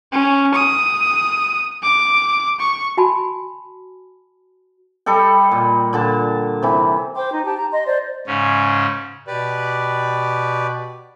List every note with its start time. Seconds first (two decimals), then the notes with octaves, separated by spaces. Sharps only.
0.12 C#4
0.54 D#6
1.83 D6
2.60 C#6
2.97 F#4 G#5 A5 B5
5.06 G3 A4 D#5 G5
5.51 A#2
5.93 A#2 D3 A5
6.63 C3 E3
7.16 C5 G5 C6 D6
7.32 D#4
7.45 G4 A5
7.57 A#5
7.72 D#5 C6
7.86 C5 D5
8.27 G#2 C#3 C#4
9.27 B2 G4 B4 D5